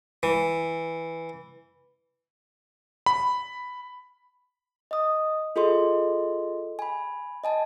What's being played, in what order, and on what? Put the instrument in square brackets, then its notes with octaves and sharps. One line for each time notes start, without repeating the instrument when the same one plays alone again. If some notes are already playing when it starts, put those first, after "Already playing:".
[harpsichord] E3
[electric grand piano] B5
[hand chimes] D#5 D#6
F4 G#4 A4 D#5 C6
G#5 B5
D#5 G#5 A5